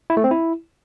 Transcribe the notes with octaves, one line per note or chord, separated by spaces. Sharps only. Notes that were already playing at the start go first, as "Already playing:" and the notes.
E4
A3
C4
E4